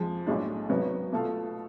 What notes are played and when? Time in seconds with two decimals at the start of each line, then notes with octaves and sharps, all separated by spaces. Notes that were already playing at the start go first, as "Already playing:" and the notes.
Already playing: F2 F3 G#3
0.27 B1 A2 G#3 D4
0.69 G#1 G#2 F#3 B3
1.12 B2 A3 F4 A4 F5